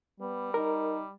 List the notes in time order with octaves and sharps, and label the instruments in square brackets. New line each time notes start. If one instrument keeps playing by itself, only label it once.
[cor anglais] G3 [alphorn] B3
[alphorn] D#4 [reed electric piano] A#4